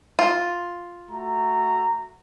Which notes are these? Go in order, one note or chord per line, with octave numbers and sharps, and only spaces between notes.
F4
A3 F#4 A#5